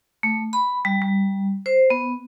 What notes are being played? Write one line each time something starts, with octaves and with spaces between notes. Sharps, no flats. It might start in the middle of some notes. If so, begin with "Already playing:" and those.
A3
B5
G3
G3
C5
B3